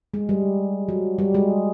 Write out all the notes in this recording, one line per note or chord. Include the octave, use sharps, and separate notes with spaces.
G#3
G3
F#3
G3
G#3